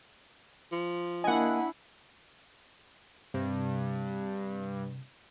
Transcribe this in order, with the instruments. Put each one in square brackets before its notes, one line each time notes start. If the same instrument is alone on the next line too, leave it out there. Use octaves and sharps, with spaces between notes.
[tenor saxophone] F3
[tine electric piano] A#3 D#5 [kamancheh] D4 E4 [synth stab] F#5 G#5
[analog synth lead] G2 [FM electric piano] C3